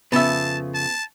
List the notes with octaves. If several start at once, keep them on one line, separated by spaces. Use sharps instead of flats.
F2 C#3 B3 E5 A5
A5